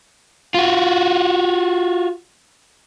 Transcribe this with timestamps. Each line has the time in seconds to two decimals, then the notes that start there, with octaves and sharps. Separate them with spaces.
0.54 F4 F#4